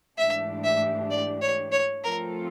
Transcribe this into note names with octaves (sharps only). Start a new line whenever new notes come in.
G#2 E3 A3 D4 G4 E5
E5
D5
C#5
C#5
F3 A3 C4 F4 A4 A#4